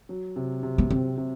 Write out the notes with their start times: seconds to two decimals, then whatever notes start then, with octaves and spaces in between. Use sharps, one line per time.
0.09 F#3
0.36 C3
0.63 C3
0.78 B3
0.90 C3 C4
1.17 C3